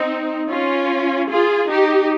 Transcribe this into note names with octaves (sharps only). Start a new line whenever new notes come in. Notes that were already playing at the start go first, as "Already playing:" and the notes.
Already playing: C4 D#4
C#4 F4
F4 G#4
D#4 G4